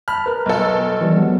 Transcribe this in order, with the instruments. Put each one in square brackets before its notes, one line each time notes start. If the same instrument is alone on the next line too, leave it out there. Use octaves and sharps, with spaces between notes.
[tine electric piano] A5 B5 [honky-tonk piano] F6
[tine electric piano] A#4 B4
[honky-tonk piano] B1 A4
[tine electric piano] E3 G3
F#3 G#3 B3